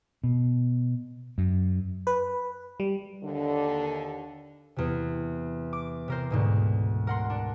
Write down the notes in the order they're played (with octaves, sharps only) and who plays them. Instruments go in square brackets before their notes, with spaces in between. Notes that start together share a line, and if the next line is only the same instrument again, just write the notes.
[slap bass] B2
F#2
[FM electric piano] B4
G3
[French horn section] D#2 D3
[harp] E2 C3
D6
C3 A#4 C5
D2 G#2 B2
A#4 F#5 C6
D4